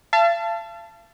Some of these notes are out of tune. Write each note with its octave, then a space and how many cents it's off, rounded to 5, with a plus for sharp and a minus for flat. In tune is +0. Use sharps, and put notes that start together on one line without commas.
F5 -45 A5 +0